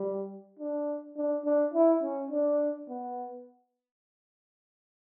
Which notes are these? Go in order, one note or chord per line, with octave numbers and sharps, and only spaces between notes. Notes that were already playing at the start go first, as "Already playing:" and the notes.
Already playing: G3
D4
D4
D4
E4
C#4
D4
B3